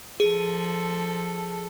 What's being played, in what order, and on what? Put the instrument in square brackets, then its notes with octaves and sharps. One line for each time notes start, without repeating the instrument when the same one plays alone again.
[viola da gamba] F3 A4 [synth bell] G#4